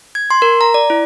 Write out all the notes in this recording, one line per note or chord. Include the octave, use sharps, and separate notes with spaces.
G#6
C6
A#4
A#5
D5
E4